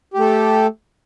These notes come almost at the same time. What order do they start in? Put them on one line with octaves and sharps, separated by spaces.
G4 A3 A4